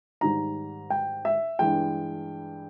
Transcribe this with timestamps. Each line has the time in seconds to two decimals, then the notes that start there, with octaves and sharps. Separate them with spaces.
0.21 G#2 D#3 G3 A#5
0.90 G5
1.25 E5
1.59 G2 E3 G#3 G5